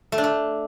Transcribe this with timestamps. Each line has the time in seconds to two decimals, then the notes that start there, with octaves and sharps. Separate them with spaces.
0.12 A3
0.18 D4
0.24 A3